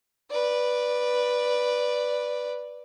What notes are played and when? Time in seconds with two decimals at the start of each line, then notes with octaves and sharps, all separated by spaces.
0.30 B4 D5